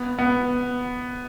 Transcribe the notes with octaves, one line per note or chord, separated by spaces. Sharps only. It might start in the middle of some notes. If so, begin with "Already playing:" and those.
Already playing: B3
B3